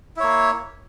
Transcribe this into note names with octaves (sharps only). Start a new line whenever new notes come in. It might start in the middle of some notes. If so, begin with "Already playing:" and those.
A#3 E4 C#5